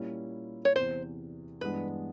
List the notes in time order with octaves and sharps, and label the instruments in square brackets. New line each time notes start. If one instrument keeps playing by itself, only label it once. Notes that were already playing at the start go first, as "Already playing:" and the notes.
Already playing: [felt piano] A#2 G3 A#3 C#4 E4
[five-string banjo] C#5
[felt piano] E2 C3 E3 [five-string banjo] C5
[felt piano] G2 E3 G#3 B3 D4 [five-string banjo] B4